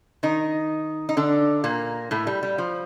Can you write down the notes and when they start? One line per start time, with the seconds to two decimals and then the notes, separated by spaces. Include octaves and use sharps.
0.23 D#3 D#4
1.09 D#4
1.17 D3 D4
1.64 A#2 A#3
2.11 A2 A3
2.27 G3
2.43 G3
2.58 F3